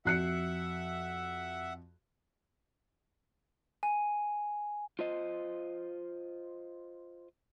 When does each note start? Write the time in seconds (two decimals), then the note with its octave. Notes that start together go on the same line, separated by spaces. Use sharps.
0.05 F2 F#4 E5 F#5 F#6 C7 C#7
3.83 G#5
4.99 F4 C5 D#5